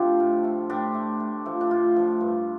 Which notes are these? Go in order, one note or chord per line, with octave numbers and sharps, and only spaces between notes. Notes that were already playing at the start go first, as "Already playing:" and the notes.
Already playing: C3 F3 A3 D4 F4 G4 C5
A2
A3
A2 D4 G4
A3
A2
F3 A3
D4
A2 F4
F3 A3
G2